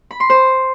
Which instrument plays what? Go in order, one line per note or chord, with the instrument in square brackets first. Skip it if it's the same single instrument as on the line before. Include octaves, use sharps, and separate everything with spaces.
[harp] B5
C6
C5